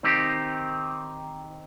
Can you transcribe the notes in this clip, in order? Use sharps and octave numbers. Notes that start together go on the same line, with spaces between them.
D#3 C4 D#4 G4